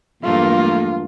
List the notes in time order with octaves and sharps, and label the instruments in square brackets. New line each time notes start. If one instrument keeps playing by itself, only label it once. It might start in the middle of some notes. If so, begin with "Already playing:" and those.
[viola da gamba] E2 G2 F#3 [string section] A3 A#3 [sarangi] F4